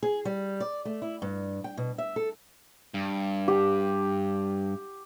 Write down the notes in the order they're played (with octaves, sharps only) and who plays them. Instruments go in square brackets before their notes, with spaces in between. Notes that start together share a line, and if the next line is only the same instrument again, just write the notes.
[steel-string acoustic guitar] G#4
G3
D5
A3
E4
G2
G5
B2
E5
A4
[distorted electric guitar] G2
[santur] G4